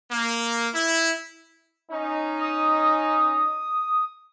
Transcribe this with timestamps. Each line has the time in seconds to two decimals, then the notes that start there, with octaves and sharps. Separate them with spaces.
0.11 A#3
0.74 E4
1.92 C#4 D#4
2.41 D#6